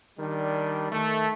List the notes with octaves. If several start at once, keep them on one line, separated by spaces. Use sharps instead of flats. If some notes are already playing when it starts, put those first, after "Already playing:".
D#3 G3 D4
D#3 A3